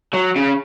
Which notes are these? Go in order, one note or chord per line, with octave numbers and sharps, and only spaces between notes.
F#3
C#3